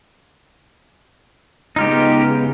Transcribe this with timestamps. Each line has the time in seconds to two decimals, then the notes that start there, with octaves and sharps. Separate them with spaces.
1.76 C#3 G#3 B3 D#4 F4 G4